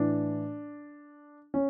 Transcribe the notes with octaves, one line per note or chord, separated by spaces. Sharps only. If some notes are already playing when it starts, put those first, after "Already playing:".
Already playing: A2 E3 D4
C#4